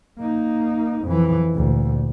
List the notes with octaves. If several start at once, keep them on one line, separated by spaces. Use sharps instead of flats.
A#3 D#4
F2 E3
D2 A#2